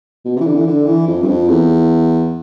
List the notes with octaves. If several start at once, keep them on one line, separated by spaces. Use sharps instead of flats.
B2
C3
E3
D3
E3
D3
E3
F2
G2
F2
E2